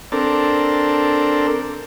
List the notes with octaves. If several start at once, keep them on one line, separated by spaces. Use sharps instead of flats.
C4 D4 A4 A#4